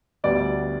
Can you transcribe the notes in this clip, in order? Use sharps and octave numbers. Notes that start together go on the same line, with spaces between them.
D2 D3 G3 B3 D5